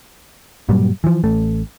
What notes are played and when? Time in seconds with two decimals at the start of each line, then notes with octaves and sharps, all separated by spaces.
0.69 G2 A#2 F#3 G3
1.04 E3 F3
1.24 A1 A3